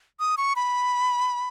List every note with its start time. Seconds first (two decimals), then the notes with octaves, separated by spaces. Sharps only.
0.20 D#6
0.37 C#6
0.56 B5